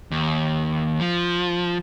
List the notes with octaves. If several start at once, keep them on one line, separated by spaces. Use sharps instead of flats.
D#2
F3